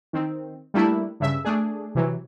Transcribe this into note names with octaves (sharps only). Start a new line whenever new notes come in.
D#3 C4
G3 A3 A#3 D4 E4
G2 C#3 E5
A3 D4 G#4
C3 E3 F#3